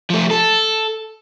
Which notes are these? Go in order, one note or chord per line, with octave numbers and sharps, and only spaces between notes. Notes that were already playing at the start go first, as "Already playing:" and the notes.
F3 A3
A4